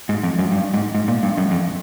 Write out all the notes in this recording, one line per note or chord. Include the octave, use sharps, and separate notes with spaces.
G#2
F2
F#2
G2
G#2
G#2
A#2
G2
F#2
F2